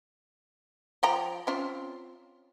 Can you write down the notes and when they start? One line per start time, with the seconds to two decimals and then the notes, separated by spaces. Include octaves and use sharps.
1.03 F3 G5 A#5
1.47 C4 C#4 F4